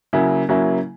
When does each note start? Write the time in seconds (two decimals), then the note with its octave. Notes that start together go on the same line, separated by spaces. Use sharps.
0.13 C#3 F#3 A#3 E4
0.49 C#3 F#3 A#3 E4